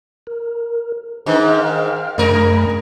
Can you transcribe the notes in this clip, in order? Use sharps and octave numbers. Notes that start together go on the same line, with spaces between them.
A#4
G#2 D#3 D4 B4
F5 G5 F6
F#2 C3 A3 A#4 B5